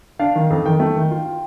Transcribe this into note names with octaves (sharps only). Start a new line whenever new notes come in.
D4 F5
D#3
F2
D#3 G5
A3
D#3
F4
F4